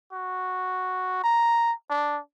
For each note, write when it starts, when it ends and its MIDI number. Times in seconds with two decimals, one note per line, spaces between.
0.13 1.20 66
1.23 1.73 82
1.90 2.19 62